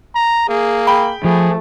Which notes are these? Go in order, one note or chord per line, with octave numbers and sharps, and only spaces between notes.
A#5
A#3 G#4
G5 B5
F3 A3 G#4